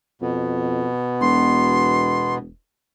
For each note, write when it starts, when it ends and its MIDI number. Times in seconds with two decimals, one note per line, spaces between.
0.22 0.89 41
0.22 2.38 47
0.22 2.38 59
1.21 2.53 28
1.21 2.35 84